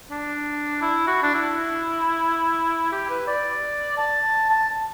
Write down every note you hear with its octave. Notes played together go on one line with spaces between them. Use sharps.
D4
E4
F#4
D4
E4
G4
B4
D5
A5
A5